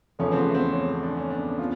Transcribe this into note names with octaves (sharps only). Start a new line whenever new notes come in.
E2 C#3 F3 A3 C#4
C4
B3
C4
C#4
D4
C#4
D4
F4